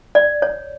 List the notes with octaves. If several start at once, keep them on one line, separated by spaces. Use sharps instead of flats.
D5
C#5